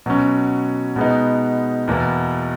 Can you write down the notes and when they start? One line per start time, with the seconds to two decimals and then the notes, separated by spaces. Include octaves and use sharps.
0.06 B2 F#3 C#4
0.96 B2 G#3 B3 D#4
1.88 E2 B2 A#3 E4